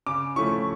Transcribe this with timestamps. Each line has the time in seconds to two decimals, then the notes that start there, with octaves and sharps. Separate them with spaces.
0.07 C#3 D6
0.36 F3 A3 C#4 E4 C#6